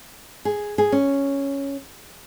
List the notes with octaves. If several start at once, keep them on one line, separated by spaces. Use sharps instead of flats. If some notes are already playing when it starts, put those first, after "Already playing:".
G#4
G#4
C#4